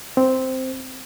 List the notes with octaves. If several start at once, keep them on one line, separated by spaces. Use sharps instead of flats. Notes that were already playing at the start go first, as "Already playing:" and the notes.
C4